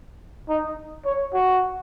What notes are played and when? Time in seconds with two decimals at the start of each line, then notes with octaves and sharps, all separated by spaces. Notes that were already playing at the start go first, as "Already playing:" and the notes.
0.49 D#4
1.05 C#5
1.34 F#4